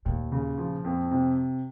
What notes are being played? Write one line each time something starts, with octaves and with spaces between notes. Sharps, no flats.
D#2 A#2
C#3
F3
F2
C3